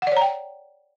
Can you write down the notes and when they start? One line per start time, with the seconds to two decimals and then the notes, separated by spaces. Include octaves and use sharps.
0.02 F#5
0.07 D5
0.12 C#5
0.17 A#5
0.21 G5